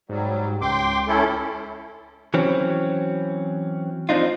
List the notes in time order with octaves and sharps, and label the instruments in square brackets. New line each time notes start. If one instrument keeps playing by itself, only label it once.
[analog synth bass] G#2 [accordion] F#3 G3
[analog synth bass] C#2 [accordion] G5 C6 D6
[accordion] C#4 E4 A4
[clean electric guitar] E3 F#3 C4 C#4
F3 C4 D4 D#4 F4